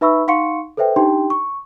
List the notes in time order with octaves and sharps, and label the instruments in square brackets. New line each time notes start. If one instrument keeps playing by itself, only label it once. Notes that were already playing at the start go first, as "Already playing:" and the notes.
[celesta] D#4 B4 E5 B5 C#6 E6
D#4 F5 F#5 C6 C#6 C#7
A4 B4 C5 E5 G5
D4 D#4 G4 G5 C6
C#6